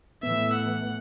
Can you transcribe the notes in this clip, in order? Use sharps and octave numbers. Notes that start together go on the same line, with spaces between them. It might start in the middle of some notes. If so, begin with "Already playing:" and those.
A2 E3 A3 B3 E5 E6
F#5